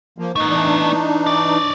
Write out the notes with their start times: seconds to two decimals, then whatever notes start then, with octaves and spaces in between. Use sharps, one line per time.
0.18 F3 A#3
0.36 A3 B3 D#4
0.49 E3 D4 D#4
1.27 C#5 D5